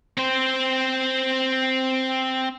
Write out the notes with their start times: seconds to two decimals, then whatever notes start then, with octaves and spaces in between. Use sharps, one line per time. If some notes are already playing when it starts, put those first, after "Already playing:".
0.18 C4 C5